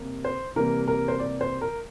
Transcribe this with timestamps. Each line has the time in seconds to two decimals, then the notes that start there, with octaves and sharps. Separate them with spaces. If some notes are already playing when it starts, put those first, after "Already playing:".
Already playing: C3 G3 A#3
0.25 C5
0.56 C3 E3 G3 A#3 A#4
0.88 A#4
1.08 C5
1.20 D5
1.41 C5
1.62 A#4